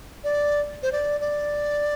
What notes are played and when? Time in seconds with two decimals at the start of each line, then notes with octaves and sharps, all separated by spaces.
0.24 D5
0.83 C5
0.92 D5
1.20 D5